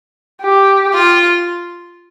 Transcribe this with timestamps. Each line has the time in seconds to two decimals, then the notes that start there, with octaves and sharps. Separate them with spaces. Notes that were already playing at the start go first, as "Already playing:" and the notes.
0.42 G4
0.94 F4